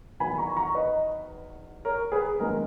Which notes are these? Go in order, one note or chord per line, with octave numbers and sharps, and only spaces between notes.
E2 D#3 F#3 B3 G#5 B5
A#5 C#6
A#5 C#6
B4 D#5
A#4 C#5
G#4 B4
F#2 D#3 G#3 B3 A#4